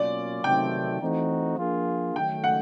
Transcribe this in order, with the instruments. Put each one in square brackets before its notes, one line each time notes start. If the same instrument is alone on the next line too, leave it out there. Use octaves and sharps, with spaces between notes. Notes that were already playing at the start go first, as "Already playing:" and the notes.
Already playing: [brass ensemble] B2 F#3 A#3 C#4 F4 [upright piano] D5
[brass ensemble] C3 D#3 F#3 A3 C4 [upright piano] G5
[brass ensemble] E3 A3 C4 D#4 F#4
F3 A#3 D4 F4 G#4
[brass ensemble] D#3 F#3 A3 [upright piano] G5
[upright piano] F#5